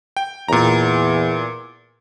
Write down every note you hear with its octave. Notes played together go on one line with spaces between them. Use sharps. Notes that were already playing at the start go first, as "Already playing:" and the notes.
G5
E2 A#2 A#5